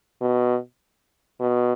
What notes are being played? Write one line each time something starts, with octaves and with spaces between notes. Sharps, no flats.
B2
B2